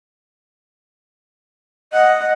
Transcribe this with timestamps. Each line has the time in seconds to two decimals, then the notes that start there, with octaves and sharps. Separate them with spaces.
1.93 D#5 F#5